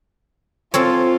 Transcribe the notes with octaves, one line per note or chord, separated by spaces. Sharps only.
C4 F4 A4 C#5